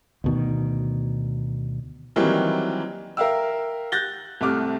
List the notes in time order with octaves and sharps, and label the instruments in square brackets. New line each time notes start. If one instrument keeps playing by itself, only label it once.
[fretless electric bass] D2 B2 D#3
[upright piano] D#3 E3 F#3 G3 A#3 C4
A#4 E5 F5 G5 E6
F#6 G6 A6 A#6 G7
C2 C3 A3 D6 F6